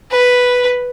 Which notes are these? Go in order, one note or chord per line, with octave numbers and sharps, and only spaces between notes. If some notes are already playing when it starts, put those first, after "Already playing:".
B4